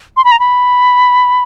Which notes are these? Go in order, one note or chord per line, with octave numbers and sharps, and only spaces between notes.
C6
B5
A#5
B5